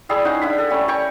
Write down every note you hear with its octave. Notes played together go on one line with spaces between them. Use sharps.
G3 E4 G#4 D5
C#4 D#4 E4 F#5
D4 E4 F#5 B5
A4
G3 A3 C#4
A#4 G5 G#5 C#6